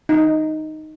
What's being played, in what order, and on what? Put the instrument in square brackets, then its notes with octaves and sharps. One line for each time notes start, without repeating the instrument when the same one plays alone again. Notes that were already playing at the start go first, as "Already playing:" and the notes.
[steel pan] D#4